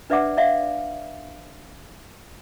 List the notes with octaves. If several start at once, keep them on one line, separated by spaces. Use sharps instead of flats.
D4 B4 D5 E5 F#5 D6
D5 E5 F5